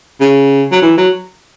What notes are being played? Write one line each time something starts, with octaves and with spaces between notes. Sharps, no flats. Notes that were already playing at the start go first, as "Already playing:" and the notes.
C#3
F#3
E3
F#3